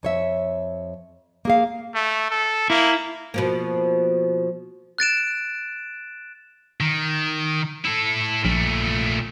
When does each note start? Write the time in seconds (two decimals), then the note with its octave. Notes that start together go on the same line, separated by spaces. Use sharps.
0.03 F2 C#5 E5
1.45 A#3 G#4 F5
1.94 A3
2.30 A4
2.70 A#3 E4
3.34 B2 F3 A#3
4.98 F#6 A6 D7 E7
6.80 D#3
7.85 E4 A4
8.45 A#1 A#2 A3